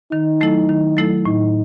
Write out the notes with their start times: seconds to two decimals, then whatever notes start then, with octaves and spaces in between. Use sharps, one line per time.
0.12 D#3 D#4
0.41 F#3 A3 E4 A4
0.69 D#3
0.97 F#3 A3 E4 A4
1.25 A2 D#4